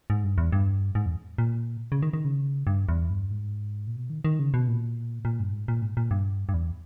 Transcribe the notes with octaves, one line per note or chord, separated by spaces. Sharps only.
G#2
G2
E2
G2
G#2
E2
A#2
C#3
D#3
D#3
C#3
G2
E2
G2
G#2
A#2
B2
D#3
D#3
C#3
B2
A#2
A#2
G2
G#2
A#2
G#2
A#2
G2
G2
E2